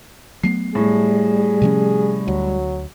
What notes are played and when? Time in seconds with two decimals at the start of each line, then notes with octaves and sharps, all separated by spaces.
0.43 F#3 A3 B3 C7
0.75 A2 G3 G#4
1.62 C3 F3 C#4
2.28 D2 F#3